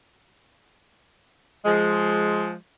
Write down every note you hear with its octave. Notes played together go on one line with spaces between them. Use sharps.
F3 G#3